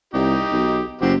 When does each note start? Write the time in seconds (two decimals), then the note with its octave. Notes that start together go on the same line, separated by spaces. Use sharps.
0.14 C2 D#4 G4
0.52 B1
1.01 F#1 C4 F#4 G4